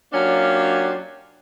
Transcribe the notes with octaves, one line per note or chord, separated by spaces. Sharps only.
F#3 A#3 C#4 D4 F4 G4